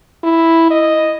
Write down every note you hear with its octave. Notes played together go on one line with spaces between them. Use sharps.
E4
D#5